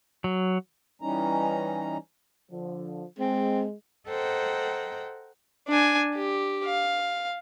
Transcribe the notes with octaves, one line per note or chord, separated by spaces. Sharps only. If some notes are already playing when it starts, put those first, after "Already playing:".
F#3
E3 G3 C#4 D#4 A#5
D3 F3
G#3 C4
A4 C5 D#5 F#5 G5 A#5
D4 G#5
G4
F5